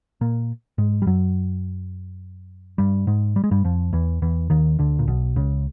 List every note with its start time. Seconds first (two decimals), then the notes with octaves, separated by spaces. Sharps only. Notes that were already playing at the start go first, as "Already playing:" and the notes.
0.21 A#2 A#3
0.78 G#2 G#3
1.02 G3
1.07 F#2 F#3
2.78 G2 G3
3.07 G#2 G#3
3.36 G3
3.44 G#3
3.51 G2 G3
3.64 F2 F3
3.93 E2 E3
4.22 E2 E3
4.50 D#2 D#3
4.79 D2 D3
4.99 A#2
5.07 B1 B2
5.36 C#2 C#3